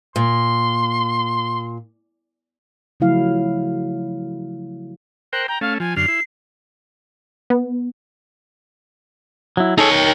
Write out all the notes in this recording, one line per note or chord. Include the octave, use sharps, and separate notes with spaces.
A#2 C6
C#3 F3 F#3 A3 E4 F5
A#4 C5 G5 F#6
G5 A#5
A3 C#4 F5
F3 G#5
F#2 D3 F6 C7
E4
B3
F#3 E4
D#4 G#4 A4 C#5
A#4 G5